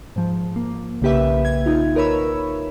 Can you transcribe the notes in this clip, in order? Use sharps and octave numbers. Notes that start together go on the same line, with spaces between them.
G#2 F3
A#3
B1 C#3 A#3 G4 B4 E5
G#6
D#4 F4
D#4 A#4 B4 C#5 B5 E6